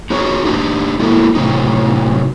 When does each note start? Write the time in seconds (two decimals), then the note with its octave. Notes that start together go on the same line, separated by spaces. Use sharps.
0.10 D#4 F#4 G#4 C#5
0.45 D4 D#4 G4
0.99 G#3 A#3 E4 F#4 A4
1.35 A2 C3 F#3 D#4